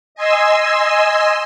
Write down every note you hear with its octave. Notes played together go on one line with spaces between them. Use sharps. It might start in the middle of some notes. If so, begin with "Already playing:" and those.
D#5 G#5 C6 E6